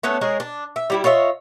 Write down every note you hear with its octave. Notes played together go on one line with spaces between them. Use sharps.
A3 B3 C#4 D4
G#3 G#4 A#4 C#5
D4
E5
G3 E4 G4
F4 C#5 D#5 E5